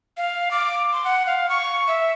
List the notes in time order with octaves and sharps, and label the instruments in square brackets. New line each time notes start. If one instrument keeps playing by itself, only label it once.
[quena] F5
D6
C6
F#5
F5
C#6
E5